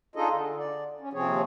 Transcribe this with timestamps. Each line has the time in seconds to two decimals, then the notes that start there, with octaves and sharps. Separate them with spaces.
0.16 D4 D#4 F4 G#4 A4 D#5
0.32 D3
0.58 D5
1.00 C#4
1.13 D#2 C3 F3 C4 G#4 C#5